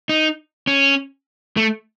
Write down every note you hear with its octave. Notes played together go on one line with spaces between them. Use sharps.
D#4
C#4
A3